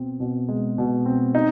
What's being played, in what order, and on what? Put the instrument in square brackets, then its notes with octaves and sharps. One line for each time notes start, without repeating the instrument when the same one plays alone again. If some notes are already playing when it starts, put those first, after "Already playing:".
Already playing: [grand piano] B2 C4
B2
G#3
B2
C4
D#4